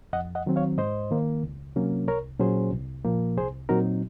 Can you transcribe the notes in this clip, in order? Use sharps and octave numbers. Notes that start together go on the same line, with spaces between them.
F2 D#5 F#5
D#5 F#5
D#3 F#3 C4
C#5 F5
G#2 C5 D#5
D#3 A#3
C#2
C3 F#3 A#3 C#4
C2 A#4 C#5
A#2 F#3 C#4 G#4 C5
C2
A#2 F3 A#3
C2 G#4 C5
A#2 F#3 C4 D#4 F#4 A#4